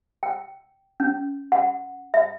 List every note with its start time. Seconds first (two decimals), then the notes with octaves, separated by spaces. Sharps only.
0.23 G5
1.00 C#4
1.52 F#5
2.14 E5